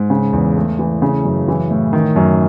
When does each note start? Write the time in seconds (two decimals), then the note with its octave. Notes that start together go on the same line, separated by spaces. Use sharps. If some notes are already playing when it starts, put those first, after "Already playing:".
Already playing: G#2
0.10 C#3
0.33 E2
0.56 A3
0.79 E3
1.02 C#3
1.25 F#2
1.48 E3
1.71 A2
1.93 D#3
2.16 F#2